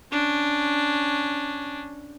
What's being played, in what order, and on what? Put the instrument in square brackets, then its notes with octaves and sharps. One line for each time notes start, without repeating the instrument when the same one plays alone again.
[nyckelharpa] C#4 D4